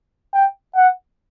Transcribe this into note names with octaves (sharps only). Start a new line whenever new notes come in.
G5
F#5